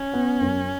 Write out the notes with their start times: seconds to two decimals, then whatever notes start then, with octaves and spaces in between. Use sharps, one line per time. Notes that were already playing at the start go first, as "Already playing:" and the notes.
Already playing: C#4
0.13 B3
0.41 F#2